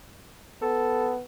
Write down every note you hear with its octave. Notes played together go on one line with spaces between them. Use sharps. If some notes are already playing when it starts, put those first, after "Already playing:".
B3 A4